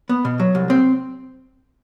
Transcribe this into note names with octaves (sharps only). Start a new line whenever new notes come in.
B3
B2
F#3
C2
C4